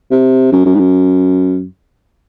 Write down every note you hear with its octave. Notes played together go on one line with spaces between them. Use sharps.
C3
F#2
F#2
G#2
F#2